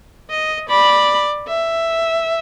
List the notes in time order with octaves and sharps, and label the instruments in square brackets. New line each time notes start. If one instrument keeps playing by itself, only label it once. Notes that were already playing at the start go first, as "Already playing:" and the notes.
[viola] D#5
[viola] D5 [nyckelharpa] B5
[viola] E5